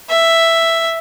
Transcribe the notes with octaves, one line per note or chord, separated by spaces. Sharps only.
E5